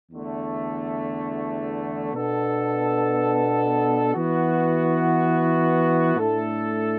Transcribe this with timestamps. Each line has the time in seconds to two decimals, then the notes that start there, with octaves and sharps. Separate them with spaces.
0.11 E2 D3 A3
2.13 B2 B3 D4 A4
4.14 E3 B3 F#4
6.15 A2 A3 D4 A4